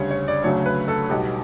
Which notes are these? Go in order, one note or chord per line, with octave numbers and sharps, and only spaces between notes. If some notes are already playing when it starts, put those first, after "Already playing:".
Already playing: D2 C#3 G3 C#5
C#5
D5
D2 C#3 F#3 A3 C#5
B4
A4
B1 B2 G3 G4